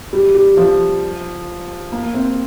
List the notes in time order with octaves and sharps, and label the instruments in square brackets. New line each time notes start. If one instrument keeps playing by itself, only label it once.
[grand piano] G3
G3
F3
A#3
C4